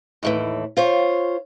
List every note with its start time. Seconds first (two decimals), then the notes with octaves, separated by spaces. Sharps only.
0.23 D#2 A2 E3
0.77 F4 C5 C#5